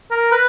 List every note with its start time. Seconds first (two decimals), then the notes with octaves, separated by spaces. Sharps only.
0.11 A#4
0.32 B4